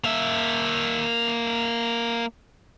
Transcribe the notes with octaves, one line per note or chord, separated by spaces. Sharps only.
A#3 E5